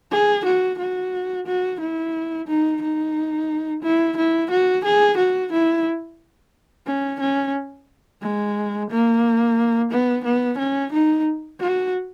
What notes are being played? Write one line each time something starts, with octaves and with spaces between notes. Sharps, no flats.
G#4
F#4
F#4
F#4
E4
D#4
D#4
E4
E4
F#4
G#4
F#4
E4
C#4
C#4
G#3
A#3
B3
B3
C#4
D#4
F#4